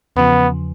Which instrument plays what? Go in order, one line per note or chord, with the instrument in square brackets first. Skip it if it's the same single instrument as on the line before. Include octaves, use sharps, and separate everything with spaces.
[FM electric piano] E2 C#3 F3 [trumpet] B3